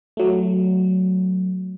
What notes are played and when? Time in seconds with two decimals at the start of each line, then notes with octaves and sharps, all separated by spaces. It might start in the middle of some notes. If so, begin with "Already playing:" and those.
0.17 F#3 A3